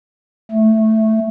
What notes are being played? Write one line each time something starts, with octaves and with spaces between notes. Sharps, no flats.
A3